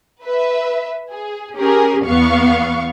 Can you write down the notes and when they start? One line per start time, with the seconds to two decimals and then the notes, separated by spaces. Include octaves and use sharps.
0.24 B4 E5
1.11 G#4
1.56 C#4 G4 G#4 A#4
2.07 E2 B3 F5 C#6